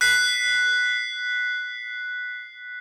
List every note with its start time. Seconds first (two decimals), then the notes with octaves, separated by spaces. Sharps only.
0.01 F#6 B6 C7